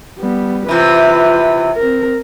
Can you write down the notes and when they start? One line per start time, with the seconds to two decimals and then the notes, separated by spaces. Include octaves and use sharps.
0.18 G3 B3
0.69 C3 E3 F4 B4
1.76 C4 A#4